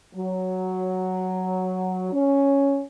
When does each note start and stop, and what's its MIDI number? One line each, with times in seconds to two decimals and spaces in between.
0.14 2.09 54
2.12 2.82 61